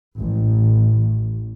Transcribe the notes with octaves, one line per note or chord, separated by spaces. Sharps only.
A1